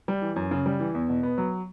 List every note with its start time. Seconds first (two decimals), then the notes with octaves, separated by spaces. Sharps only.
0.08 G3
0.22 E3
0.36 F#2
0.51 C#3
0.66 G3
0.80 E3
0.95 E2
1.09 B2
1.23 B3
1.38 F#3